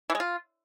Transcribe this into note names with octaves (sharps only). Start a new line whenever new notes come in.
E3
G#3
F4